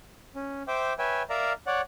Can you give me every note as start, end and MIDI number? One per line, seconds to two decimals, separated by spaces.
0.35 0.63 61
0.68 0.93 72
0.68 0.93 76
0.68 0.93 79
0.68 0.93 86
0.99 1.23 71
0.99 1.23 73
0.99 1.23 76
0.99 1.23 79
0.99 1.23 80
1.30 1.53 70
1.30 1.53 74
1.30 1.53 76
1.30 1.53 77
1.30 1.53 82
1.67 1.81 73
1.67 1.81 74
1.67 1.81 78